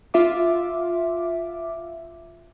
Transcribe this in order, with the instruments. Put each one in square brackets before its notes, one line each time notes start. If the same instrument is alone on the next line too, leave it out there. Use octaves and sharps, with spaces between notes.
[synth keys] F4 E5 D6